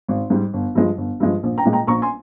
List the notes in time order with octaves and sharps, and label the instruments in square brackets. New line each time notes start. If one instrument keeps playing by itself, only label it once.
[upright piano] G#1
G#2 G3
G1
G2 F3 G#3
G1
G2 F3 G#3
A#1
G5 A#5
A#2 G#3
G5 A#5
A#1 A#5 C#6
G#5 C6